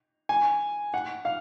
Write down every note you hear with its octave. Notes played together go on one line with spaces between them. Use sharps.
G#5
F#5
F5